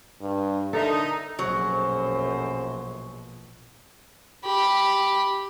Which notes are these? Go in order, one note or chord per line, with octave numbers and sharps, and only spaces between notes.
G2
D3 D#4 A4 A#4 E5 A#5
A#1 F#2 B2 F#3 G#4 A4 C5
G4 B5